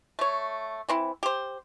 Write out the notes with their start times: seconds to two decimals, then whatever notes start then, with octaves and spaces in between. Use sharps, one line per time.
0.19 A3 C#5
0.89 E3 C4 E4
1.23 G4 C5